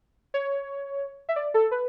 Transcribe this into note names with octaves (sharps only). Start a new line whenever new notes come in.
C#5
E5
D5
A4
B4